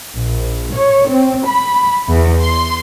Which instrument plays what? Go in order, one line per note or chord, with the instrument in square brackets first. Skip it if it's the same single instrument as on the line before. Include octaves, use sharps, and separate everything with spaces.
[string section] A#1
C#5
C4
B5
E2
C6